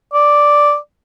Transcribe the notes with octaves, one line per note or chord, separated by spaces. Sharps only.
D5